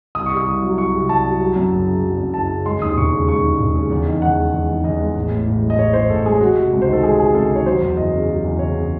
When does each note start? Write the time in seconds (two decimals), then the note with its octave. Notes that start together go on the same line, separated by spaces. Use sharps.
0.15 C2 D#6
0.26 C#6
0.32 C3
0.37 D#6
0.46 C2
0.62 F#3
0.78 C2 C#6
0.93 C3
1.09 C2 A5
1.25 F#3
1.41 F#3
1.56 F#2
1.72 F#1
1.88 C#3
2.03 F#3
2.18 F#2
2.34 F#1 A5
2.49 C#3
2.65 G#3 C6
2.81 D#2 D#6
2.96 E1 C#6
3.12 C#3
3.28 G#3 C#6
3.43 D#2
3.60 E1
3.76 C#3
3.90 E2
4.06 D#3
4.22 E2 F#5
4.38 G#3
4.54 E2
4.69 D#3
4.84 E2 D#5
5.00 G#3
5.16 A1
5.31 A2
5.47 A1
5.63 G#3
5.70 D#5
5.78 A1 C#5
5.93 A2 C5
6.10 A1 A4
6.25 G#3 G#4
6.41 G#3 F#4
6.57 C3
6.73 C#2
6.82 C5
6.88 D#3 A4
7.03 G#3 G#4
7.20 C3 G#4
7.34 C#2 A4
7.51 D#3 C#5
7.66 F#3 C5
7.81 E2
7.97 F#1 D#5
8.13 C#3
8.28 F#3
8.44 E2
8.59 F#1 C#5
8.75 C#3